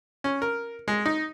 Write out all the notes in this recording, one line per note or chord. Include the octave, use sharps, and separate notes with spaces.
C#4
A#4
G#3
D#4